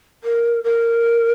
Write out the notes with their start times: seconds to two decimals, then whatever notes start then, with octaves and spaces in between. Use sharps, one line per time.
0.23 A#4
0.64 A#4